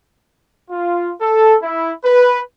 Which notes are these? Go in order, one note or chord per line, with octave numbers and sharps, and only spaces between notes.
F4
A4
E4
B4